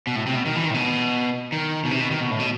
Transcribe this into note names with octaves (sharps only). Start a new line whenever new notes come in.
B2
A2
C3
B2
D#3
E3
D#3
A2
B2
D#3
B2
C3
B2
D#3
B2
A2
B2